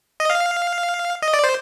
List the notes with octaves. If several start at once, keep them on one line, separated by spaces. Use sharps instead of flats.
D#5
F5
D#5
D5
C5